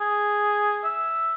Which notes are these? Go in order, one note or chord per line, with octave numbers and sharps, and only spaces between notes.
G#4
E5